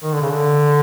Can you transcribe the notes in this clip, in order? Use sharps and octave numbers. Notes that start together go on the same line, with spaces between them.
D#3
D3
C#3
D3